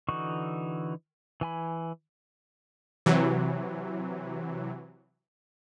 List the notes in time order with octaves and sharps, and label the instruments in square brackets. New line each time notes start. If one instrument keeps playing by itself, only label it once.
[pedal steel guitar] D3 E3 D#4 F#4 C#6
E3 G#5 B5
[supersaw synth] C3 E3 F#3